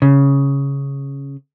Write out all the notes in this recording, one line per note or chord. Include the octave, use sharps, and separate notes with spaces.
C#3